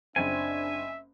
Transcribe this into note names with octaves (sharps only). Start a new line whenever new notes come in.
F#1 C4 D4 E5 G#5